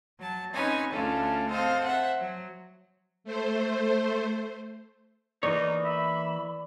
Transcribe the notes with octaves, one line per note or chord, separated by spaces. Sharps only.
F#3 A5
C4 C#4 D#4 B4 C#5 G#5
D2 A3 C#4 D4 F4 A4
C4 A4 C5 D#5 F5
C5 E5 F#5
F#3
A3 C5
E3 A#3 D#4 C#5 D5
E5 B5